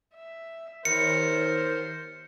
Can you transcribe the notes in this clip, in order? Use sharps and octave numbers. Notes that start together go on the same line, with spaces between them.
E5
D#2 A#4 C5 C#7